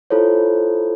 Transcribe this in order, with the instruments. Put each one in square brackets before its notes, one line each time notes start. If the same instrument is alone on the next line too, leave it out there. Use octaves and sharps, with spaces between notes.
[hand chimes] E4 F4 A4 C5 C#5